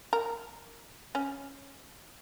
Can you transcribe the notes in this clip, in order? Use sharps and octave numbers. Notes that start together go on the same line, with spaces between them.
A#4
C#4